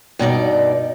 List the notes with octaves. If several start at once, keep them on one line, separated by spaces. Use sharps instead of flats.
G2 B2 D#4 D5